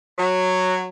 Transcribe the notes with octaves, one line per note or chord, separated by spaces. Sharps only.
F#3